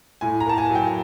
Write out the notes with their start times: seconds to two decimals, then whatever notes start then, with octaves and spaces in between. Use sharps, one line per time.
0.21 A2 G#5
0.40 A#5
0.46 A#3 A5
0.58 G#5
0.70 F#3
0.75 G5